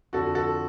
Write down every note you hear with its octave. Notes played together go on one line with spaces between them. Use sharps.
F2 D3 F3 F#4 A4
F#4 A4